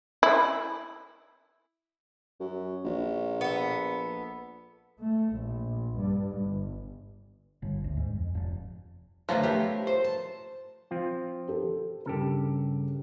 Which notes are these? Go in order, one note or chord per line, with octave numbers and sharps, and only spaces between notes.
E4
F#2
A#1
B3 A4
A3
A#1
G2
G1
G1
D2
G#2
F2
F1
D3 D#3 F3 F#3 A3 B3
A3 G4 A#4
C5
A5
F3 C4 F4
G4 A4 A#4
G2 C#3 G4 A4 A#4